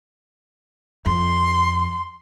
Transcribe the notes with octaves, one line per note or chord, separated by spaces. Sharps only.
F2 C6